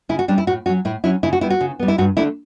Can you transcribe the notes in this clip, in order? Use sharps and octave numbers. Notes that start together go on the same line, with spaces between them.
C#3 E4
F#4
G3 C#4 D4
E4
A2 F#4
F#3 C#4 F#4
A2 E4
F#3 C#4 E4
C#3 E4
F#4
G3 B3 E4
F#4
C#3
G3 B3
E4
G2 F#4
D3 A3 D4 E4